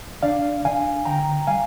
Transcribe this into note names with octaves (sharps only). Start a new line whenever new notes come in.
D4 D5 F5
D4 F5 G#5
D3 G5 A#5
G3 F5 G#5